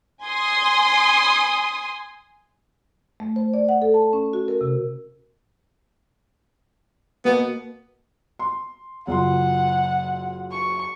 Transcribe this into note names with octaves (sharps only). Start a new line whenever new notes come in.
G#5 C6 D#6
A3
C5
D5
F#5
A4
A5
C#4
F#4
A#4
C3
B2 A#3 B3
C6
F#1 F4 F#5 C6
C#6